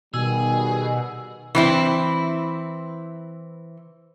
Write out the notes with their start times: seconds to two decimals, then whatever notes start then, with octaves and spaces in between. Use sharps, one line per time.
0.14 B2 D#3 G3 G#4 E6
1.55 E3 C4 E4